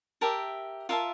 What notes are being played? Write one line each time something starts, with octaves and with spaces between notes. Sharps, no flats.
G4 A#4 E5 A5
F4 A#4 E5 A5